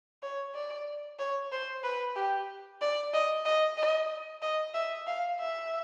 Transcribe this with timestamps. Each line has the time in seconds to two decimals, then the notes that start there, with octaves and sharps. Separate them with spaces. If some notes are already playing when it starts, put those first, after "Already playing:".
0.23 C#5
0.55 D5
1.19 C#5
1.52 C5
1.83 B4
2.16 G4
2.81 D5
3.14 D#5
3.45 D#5
3.77 D#5
4.42 D#5
4.74 E5
5.07 F5
5.40 E5